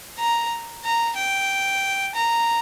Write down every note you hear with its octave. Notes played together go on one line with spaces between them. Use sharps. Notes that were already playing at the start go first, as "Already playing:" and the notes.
A#5
A#5
G5
A#5